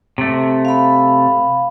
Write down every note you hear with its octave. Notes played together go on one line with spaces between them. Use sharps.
C3 A3
F5 B5